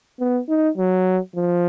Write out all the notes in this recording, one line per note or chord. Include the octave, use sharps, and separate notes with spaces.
B3
D#4
F#3
F3